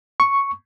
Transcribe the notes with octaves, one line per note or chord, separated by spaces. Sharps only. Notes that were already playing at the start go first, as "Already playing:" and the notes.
C#6